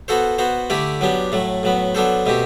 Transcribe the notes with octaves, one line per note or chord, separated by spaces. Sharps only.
B3 F#4 A4 C5
B3 F#4 C5
D3 A3 E4 G4 D5
F#3 B3 D4 G4
A2 F#3 A3
A2 F#3 B3
F#3 B3 D4 A4 C5
B2 A3 C4 G4